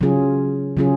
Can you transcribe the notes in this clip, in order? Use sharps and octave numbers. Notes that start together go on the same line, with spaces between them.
C#3 F#3 C#4 F4 G#4
C#3 F#3 C#4 F4 G#4